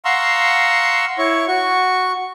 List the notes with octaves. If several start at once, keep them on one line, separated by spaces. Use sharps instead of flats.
F5 F#5 A#5 C6 C#6 E6
E4 C#5 C#6
F#4 C#6